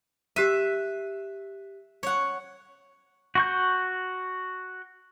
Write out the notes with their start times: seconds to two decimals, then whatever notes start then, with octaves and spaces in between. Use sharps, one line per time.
0.36 G4 E5 F#6 D#7
2.03 C#5 F#5
3.35 F#4 C#6 G6